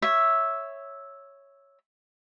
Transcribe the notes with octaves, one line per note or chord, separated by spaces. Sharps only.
C#5 E5